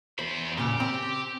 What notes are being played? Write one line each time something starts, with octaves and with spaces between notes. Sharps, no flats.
E2 C5 B5
A#2 C#3 G4
C4